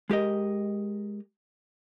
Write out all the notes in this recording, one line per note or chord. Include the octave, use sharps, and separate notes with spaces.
G#3 G4 A#4 D#5